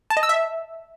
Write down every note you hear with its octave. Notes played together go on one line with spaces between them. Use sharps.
A5
D#5
E6
E5